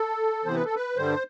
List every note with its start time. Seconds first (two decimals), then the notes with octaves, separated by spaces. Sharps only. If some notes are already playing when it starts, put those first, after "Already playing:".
Already playing: A4
0.45 C3 E3 B3 C5
0.54 B4
0.65 A4
0.76 B4
0.96 G2 D3 G3 C5